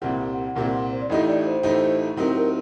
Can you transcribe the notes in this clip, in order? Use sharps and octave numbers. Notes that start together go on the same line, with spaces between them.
C2 A#2 G3 C4 G4 F#5
C2 A#2 G3 C4 G4
C5
D5
A1 A2 A3 D#4 G4 D#5
D5
C5
A1 A2 A3 D#4 G4
A2 F#3 C4 D#4 G4 A#4
A#4